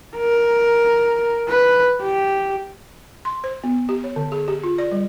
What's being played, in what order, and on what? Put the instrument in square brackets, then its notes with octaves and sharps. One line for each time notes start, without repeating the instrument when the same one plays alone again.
[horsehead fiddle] A#4
B4
G4
[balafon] C6
C5
B3
G4
C#5
D3
G#4
G4
F4
D5
G3